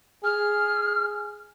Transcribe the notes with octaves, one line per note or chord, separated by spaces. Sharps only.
G#4 F6